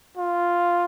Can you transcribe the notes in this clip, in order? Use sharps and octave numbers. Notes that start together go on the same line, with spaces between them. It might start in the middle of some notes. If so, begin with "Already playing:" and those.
F4